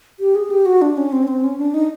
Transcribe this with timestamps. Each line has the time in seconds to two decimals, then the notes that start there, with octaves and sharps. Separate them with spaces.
0.20 G4
0.35 G#4
0.50 G4
0.66 F#4
0.82 D4
0.97 C#4
1.12 C4
1.23 C#4
1.28 C4
1.44 C#4
1.58 D4
1.74 D#4